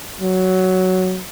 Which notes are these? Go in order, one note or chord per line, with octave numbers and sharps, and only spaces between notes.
F#3